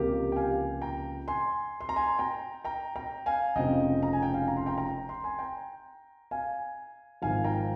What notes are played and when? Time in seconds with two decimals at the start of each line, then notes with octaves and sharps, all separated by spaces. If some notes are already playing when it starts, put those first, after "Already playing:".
Already playing: C#2 C3 F3 A#3 G4 A#4
0.32 G5
0.36 F5 G#5
0.82 G5 A#5
1.28 G#5 C6
1.81 C6
1.89 A#5
1.96 G#5 C6
2.19 G5 A#5
2.65 G5 A#5
2.96 G5 A#5
3.26 F5 G#5
3.56 F1 F2 C#3 F3 D#5 G5
4.03 A#5
4.13 G#5
4.22 G5
4.33 F5 G#5
4.48 A#5
4.57 C6
4.66 G5 A#5
4.78 G5 A#5
5.09 C6
5.24 G#5 C6
5.39 G5 A#5
6.31 F5 G#5
7.22 G#1 G#2 F3 F5 G#5
7.44 G5 A#5